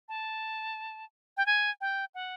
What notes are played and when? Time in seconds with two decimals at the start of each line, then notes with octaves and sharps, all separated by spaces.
0.09 A5
1.37 G5
1.46 G#5
1.81 G5
2.15 F#5